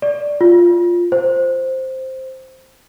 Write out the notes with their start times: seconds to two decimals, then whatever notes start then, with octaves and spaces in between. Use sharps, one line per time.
0.02 D5
0.41 F4
1.12 C5